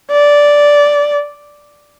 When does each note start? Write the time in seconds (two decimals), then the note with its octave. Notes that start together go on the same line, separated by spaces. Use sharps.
0.12 D5